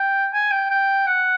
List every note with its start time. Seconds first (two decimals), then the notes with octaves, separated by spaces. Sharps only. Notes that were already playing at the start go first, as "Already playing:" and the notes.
Already playing: G5
0.33 G#5
0.51 G5
0.71 G5
1.07 F#5